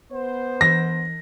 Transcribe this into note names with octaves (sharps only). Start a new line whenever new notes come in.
B3 C5
E3 A#6